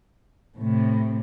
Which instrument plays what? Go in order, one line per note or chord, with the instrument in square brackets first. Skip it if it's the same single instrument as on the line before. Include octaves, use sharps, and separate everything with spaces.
[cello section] A2 C3